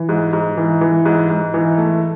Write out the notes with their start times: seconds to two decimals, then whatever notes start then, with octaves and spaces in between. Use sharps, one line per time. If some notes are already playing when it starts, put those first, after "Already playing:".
Already playing: E3
0.09 G#2
0.33 G#2
0.57 E3
0.81 E3
1.05 G#2
1.30 G#2
1.54 E3
1.78 A3